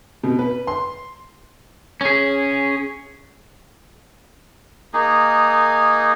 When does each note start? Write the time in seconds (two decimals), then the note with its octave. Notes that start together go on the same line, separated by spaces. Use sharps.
0.23 B2
0.39 B4
0.67 C6
2.01 C#4 G#4
4.94 A#3 D#4 G#4